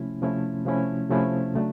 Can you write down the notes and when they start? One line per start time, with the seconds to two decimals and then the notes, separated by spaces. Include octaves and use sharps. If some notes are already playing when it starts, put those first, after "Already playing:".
Already playing: C3 F3 A3 C#4 E4
0.22 C3 F3 A3 C#4 E4
0.65 C3 F3 A3 C#4 E4
1.09 C3 F3 A3 C#4 E4
1.54 C#3 F#3 A3 D4